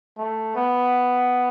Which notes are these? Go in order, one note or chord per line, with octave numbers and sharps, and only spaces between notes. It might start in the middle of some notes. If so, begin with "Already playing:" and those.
A3
B3